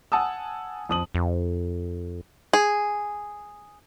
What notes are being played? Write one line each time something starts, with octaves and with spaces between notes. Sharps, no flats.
F#5 G#5 A5 D#6 E6
F2 D#6 F#7
F2
G#4